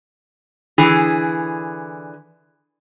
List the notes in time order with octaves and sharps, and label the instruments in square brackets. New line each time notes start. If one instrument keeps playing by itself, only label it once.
[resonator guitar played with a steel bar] D3 E3 G#4